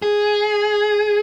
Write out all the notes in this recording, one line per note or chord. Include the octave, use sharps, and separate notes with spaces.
G#4